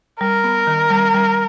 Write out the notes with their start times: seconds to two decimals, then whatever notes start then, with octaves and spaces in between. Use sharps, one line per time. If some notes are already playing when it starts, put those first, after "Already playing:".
0.20 G3 A#4
0.44 B3
0.67 D#3
0.91 G3
1.14 G3